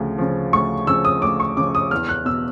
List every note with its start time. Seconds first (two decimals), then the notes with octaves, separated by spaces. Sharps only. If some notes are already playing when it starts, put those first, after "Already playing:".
Already playing: D2 C#3 F3
0.18 C#3 F3
0.53 D2 C#6
0.87 C#3 F3 E6
1.05 D#6
1.22 D2 D6
1.40 C#6
1.57 C#3 F3 D6
1.75 D#6
1.91 E2 F6
2.09 F#6
2.25 B2 E6